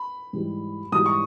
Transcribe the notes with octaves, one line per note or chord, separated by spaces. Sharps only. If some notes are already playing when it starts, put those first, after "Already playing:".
Already playing: B5
G#2 E3 G3
G#2 E3 G3 D#6
C#6